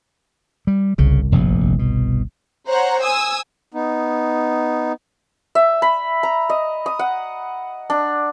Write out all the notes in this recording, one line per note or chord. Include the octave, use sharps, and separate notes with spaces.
G3
G1 C2 C#3
F1 A#1 G2
B2
C5 C#5 F#5 A#5
G#5 D#6 E6
B3 D#4
E5
B5
A#5
D#5
D#6
F#5
D4